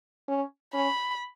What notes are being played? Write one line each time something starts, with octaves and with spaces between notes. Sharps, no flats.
C#4
C#4 B5